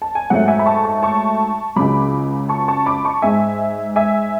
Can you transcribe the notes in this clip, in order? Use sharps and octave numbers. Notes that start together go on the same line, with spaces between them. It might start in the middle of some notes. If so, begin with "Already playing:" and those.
A5
G#5
G#2 F#3 A3 F#5
E5 G#5
B5
A5 C#6
A5 C#6
A5 C#6
C#2 C#3 F#3 B5 D6
A5 C#6
A5 C#6
B5 D6
A5 C#6
G#2 G#3 E5 G#5
E5 G#5